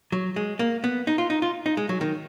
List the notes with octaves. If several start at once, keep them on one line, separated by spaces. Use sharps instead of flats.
F#3
G#3
A#3
B3
D#4
F4
D#4
F4
D#4
G#3
F#3
D#3